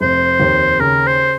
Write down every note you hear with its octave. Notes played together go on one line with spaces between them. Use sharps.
F1 C5
D#2
C#3 A#4
C5